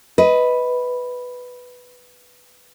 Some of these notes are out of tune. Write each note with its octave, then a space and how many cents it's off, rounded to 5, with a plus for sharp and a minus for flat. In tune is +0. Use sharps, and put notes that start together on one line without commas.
B4 +0 D#5 +20